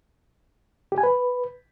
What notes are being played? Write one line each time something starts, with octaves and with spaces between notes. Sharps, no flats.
G4
G#5
B4